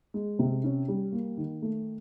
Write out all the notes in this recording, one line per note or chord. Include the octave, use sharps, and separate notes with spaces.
G#3
C3
C#4
G3
A#3
D#3
A3